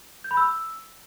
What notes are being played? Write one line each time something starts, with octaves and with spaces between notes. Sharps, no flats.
G6
B5
E6